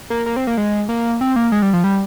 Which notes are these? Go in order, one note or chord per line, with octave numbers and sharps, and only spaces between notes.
A#3
A#3
C4
A#3
G#3
A#3
C4
A#3
G#3
G3
F3
G3